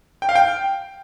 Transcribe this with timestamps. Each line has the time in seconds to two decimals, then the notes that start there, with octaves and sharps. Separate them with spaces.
0.22 G5
0.29 F5
0.35 G5